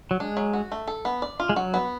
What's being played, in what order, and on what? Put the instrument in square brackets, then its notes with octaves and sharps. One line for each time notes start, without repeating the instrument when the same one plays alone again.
[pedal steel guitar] F#3
[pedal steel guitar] G#3 [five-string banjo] D4
[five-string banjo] F#3
F#4
A3
A4
B3
D5
F4
[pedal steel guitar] G#3
[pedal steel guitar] F#3 [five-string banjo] F#4
[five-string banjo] B3